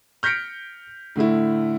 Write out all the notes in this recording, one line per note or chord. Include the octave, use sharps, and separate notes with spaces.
F6 G6 A#6 B6 C#7 D7
A2 D3 A3 E4